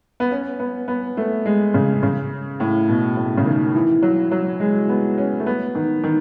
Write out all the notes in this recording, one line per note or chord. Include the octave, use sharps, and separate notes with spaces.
B3
C#4
B3
B3
A3
G#3
C#3
C#3
A2
B2
A2
C#3
D#3
E3
F#3
F#3
G#3
B3
C#4
A3
B3
D#3
D#3